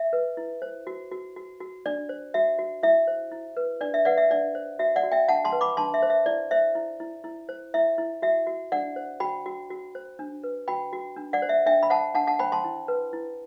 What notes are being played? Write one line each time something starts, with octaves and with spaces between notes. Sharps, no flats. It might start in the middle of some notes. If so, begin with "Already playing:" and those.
Already playing: E5
B4
E4
C5
F#4
F#4
F#4
F#4
D4 D5
C5
F#4 E5
F#4
E4 E5
C5
E4
B4
D4 D5
E5
B4 D5 F#5
E5
D4 D5
C5
F#4 E5
D5 F#5
F#4
E5 G5
D4 F#5 A5
A5 C6
B4
B5 D6
D4 A5 C6
E5
C5
E5
E4 D5
C5 E5
E4
E4
E4
C5
E4 E5
E4
F#4 E5
F#4
D4 D5 F#5
C5
F#4 G5 B5
F#4
F#4
C5
D4
B4
F#4 G5 B5
F#4
D4
D5 F#5
C5
E5
D4 E5 G5
B5
C5 F#5 A5
D4 F#5 A5
F#5 A5
C5 G5 B5
A5 C6
E4
B4
E4